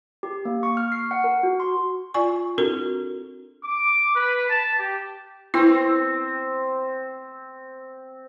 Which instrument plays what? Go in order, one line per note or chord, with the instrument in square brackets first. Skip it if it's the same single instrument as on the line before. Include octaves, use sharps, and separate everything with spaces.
[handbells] G4
A#3
C#6
F6
C7
F#5
A#4
F#4
C6
[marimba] F4 D5 G#5 C#6
C4 D4 E4 F#4 A4 A#4
[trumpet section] D6
B4
A5
G4
[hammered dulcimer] C4 [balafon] E4